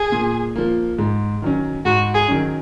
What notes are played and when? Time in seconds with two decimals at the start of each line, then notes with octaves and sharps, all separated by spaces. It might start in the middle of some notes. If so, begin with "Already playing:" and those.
Already playing: G#4
0.12 A#2
0.56 F3 A#3
0.98 G#2
1.42 D#3 F#3 C#4
1.85 G#2 F#4
2.14 G#4
2.28 D#3 F#3 C#4